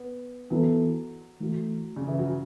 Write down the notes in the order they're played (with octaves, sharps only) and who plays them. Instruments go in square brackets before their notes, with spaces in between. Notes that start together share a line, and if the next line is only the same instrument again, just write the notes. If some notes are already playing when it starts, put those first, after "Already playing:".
Already playing: [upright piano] B3
[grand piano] E3 B3 A4 [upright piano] F#3
[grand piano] E3 A3 F#4
[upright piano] C#3
E3
F#3